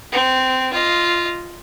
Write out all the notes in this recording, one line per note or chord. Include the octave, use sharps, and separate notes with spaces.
C4
F4 D#5